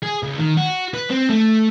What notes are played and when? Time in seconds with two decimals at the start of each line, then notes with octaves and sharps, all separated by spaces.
0.02 G#4
0.23 C#2
0.39 D#3
0.57 F#4
0.94 B4
1.10 C4
1.30 A3